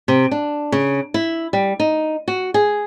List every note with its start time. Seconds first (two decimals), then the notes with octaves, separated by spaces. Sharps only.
0.08 C3
0.31 D4
0.72 C#3
1.14 E4
1.53 G3
1.80 D#4
2.28 F#4
2.54 G#4